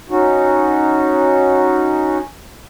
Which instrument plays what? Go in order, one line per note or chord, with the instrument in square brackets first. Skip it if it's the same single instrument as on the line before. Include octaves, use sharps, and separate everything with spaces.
[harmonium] C#4 D#4 F#4